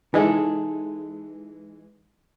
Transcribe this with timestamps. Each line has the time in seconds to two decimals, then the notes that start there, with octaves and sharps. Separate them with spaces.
0.14 E3 G#3 D#4 G#4 A4